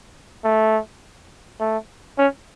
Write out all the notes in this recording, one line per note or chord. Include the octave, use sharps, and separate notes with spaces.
A3
A3
C#4